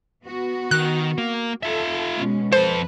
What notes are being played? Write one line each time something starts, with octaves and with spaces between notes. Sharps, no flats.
B3 F#4
D#3 F#6
A#3
F4 A4 E5
B2 G#3 C#4
F2 A4 B4 C5